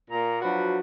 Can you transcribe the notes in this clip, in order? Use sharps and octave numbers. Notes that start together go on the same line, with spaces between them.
A#2 A#5
F3 F#3 D4 F#4 B4